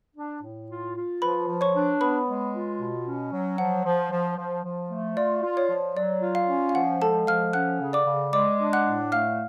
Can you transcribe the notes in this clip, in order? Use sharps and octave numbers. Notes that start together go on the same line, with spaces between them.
D4
A2
F4
F4
F3 B4 B5
F3
C#5 C#6
D4
B3 B4 B5
G#3
F4
B2
C#4
F#3
F3 F#5
F3
F3
F3
F3
A3
F4 D5
F4
C#5
F3
F#3 D5
F4
F5
C#4
F5
F3 F#5
G#3 A4 A5
F3 F5 F6
C#4 F#5 F#6
C#3
D5 D6
C#3
G#3 D5 D6
D4
F#5 F#6
A2
A3 F5 F6